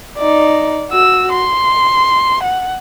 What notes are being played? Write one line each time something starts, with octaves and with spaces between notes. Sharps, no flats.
D#4 D5
F#4 E6
C6
F#5